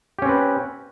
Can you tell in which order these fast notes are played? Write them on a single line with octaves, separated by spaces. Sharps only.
G4 C#4 C4 B4